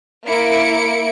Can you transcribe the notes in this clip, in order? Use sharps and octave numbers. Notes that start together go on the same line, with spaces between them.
A#3 E4 C#7 D7